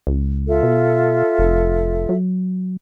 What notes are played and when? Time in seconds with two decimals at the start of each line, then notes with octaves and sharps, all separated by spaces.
0.07 C#2
0.47 F4 A4 E5
0.63 B2
1.38 F1
2.09 F#3